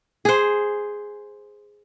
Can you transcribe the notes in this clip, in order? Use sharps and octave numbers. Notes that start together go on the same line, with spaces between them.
G#4 C5